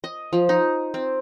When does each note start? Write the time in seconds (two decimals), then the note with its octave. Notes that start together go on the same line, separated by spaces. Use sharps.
0.04 D#5
0.33 F3
0.49 D#4
0.94 C4